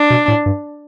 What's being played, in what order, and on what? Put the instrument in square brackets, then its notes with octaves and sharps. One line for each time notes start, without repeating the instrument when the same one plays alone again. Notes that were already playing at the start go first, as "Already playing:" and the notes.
Already playing: [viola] D4
[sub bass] B2
A2
G2